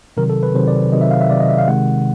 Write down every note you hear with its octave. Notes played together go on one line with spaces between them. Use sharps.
C3 D#3 F#3 A#4
A4
B4
C3 D#3 F#3 C5
D5
C3 D#3 F#3 D#5
E5
F5
E5
C3 D#3 F#3 D5
D#5
E5
F5
C3 D#3 G#3 F#5